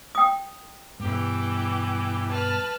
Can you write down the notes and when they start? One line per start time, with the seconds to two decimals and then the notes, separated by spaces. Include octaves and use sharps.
0.15 G5 D#6
1.00 G2 B2 E3 G4
2.29 B4 A5 F6